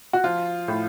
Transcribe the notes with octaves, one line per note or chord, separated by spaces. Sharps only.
F#4
F3 F4
A2